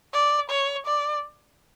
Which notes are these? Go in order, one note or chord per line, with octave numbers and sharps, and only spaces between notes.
D5
C#5
D5